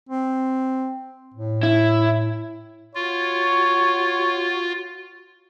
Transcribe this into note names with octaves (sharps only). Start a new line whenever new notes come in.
C4
A2
E4
F4 F#4 C#5